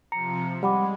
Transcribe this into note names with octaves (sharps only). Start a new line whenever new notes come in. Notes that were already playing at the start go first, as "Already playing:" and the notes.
C3 F3 A#5 C#7
G3 G#3 F#5 B5 D6